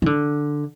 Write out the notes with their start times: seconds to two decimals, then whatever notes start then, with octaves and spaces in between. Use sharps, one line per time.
0.02 E3
0.06 D3